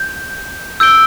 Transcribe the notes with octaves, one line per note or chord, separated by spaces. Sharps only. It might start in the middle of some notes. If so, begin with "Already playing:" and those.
Already playing: G6
E6 G6 D7 G7